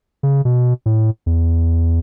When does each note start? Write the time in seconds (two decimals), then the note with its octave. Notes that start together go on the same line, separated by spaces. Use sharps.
0.23 C#3
0.45 B2
0.86 A2
1.26 E2